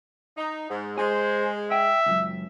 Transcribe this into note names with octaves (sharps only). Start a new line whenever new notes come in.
D#4
G#2
G#3 G#4 C5
E5 G5
C#2 F#2